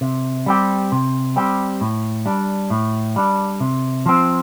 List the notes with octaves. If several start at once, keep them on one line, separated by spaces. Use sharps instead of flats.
C3
G3 C4 G4
C3
G3 C4 G4
A2
G3 D4
A2
G3 D4
C3
F3 C4